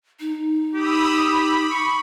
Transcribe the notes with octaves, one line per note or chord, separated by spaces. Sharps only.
D#4
G4 B5 D#6 E6
B5
C#6